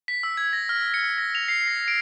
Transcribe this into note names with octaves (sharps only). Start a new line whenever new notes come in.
B6
E6
G#6
A#6
F6
C#7
A#6
F7
C7
A#6
D7